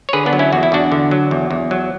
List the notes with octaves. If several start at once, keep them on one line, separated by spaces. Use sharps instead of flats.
C#5
D3 G#4 B4
B3 D4
F#3
C#4 E4
E2 F#4
E4
E2 D4 F#4
D3
F#3
E2
E2
F#3